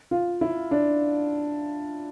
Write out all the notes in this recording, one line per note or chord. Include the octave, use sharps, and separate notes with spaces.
F4
E4
D4